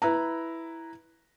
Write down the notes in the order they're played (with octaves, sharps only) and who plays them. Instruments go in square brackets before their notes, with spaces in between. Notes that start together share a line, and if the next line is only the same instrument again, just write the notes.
[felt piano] E4 B4 A#5